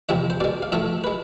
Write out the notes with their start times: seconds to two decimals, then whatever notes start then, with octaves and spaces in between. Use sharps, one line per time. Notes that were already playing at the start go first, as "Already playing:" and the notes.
0.09 E2 C3 F3 G#3 E5
0.30 C5
0.40 B2 G#3 D5
0.62 F5
0.72 A2 F3 A3 E5
1.04 G#3 B4